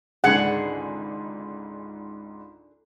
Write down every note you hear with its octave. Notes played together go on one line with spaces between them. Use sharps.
G#1 C#2 G#2 D3 G#4 A4 F#5